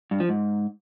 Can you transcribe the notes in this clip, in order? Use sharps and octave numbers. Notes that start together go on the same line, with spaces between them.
G2
F3
G#2